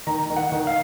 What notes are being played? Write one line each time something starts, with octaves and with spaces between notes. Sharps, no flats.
D#3 A#5
D#3
F#5
D#3
F5